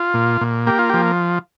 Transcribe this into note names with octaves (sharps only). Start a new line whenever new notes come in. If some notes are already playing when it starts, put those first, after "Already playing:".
Already playing: F4
A#2
A#2
A#3 G4
F4
F3 G4